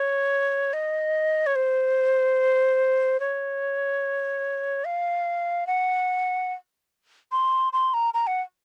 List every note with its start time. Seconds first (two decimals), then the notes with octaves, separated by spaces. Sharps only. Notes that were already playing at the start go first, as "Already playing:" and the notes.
Already playing: C#5
0.73 D#5
1.46 C#5
1.56 C5
3.20 C#5
4.85 F5
5.67 F#5
7.32 C6
7.73 C6
7.94 A#5
8.14 A#5
8.27 F#5